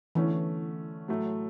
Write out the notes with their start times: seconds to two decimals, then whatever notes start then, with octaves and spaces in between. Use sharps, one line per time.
0.15 D3 E3 A3 C#4
1.08 A2 F#3 A3